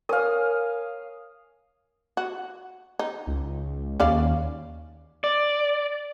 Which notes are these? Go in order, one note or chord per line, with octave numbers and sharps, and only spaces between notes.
A#4 C#5 F5 G#5 D#6
F#4
D#4
C#2
D#2 C#4 D5 F5
D5